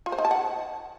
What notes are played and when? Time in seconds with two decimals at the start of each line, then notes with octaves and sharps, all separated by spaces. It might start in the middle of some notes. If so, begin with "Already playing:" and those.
0.06 F4
0.12 C5
0.18 D#4
0.25 A5
0.31 F#5